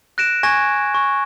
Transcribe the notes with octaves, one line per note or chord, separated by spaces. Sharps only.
F#6 A#6 D7 E7
G#5 C#6 G#6 A#6
C#6